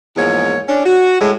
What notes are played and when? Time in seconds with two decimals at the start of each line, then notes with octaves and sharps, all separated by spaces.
0.17 E2 G#2 F3 A#3 C#5
0.68 C#4 D4
0.85 F#4
1.20 A2 G#3